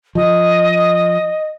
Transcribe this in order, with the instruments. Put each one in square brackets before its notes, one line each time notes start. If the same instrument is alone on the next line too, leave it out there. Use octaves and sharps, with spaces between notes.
[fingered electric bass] F3 [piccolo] D#5